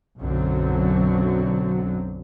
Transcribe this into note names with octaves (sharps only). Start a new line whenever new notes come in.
B1 F#2 D3 F#3 C4